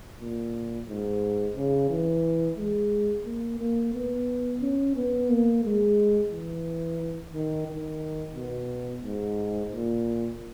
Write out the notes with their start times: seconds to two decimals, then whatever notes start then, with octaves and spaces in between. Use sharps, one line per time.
0.20 A#2
0.88 G#2
1.56 C#3
1.90 E3
2.57 G#3
3.25 A#3
3.60 A#3
3.94 B3
4.61 C#4
4.96 B3
5.30 A#3
5.64 G#3
6.31 E3
7.34 D#3
7.67 D#3
8.35 B2
9.03 G#2
9.71 A#2